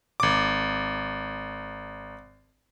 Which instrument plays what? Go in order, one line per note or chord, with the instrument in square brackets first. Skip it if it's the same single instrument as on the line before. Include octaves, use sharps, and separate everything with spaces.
[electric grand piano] G#1 D6